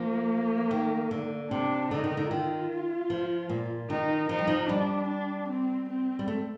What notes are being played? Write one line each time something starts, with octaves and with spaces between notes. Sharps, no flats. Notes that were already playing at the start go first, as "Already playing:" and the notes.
Already playing: F3 A#3
D#3
D3
C3 D4
D3 D#4
D#3
D3
D#3 F4
F3
A#2
D#3 D#4
F3 D#4
G3
F3
G3 D4
D4
C4
C4
G3
A3